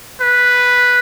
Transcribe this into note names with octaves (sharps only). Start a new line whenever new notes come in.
B4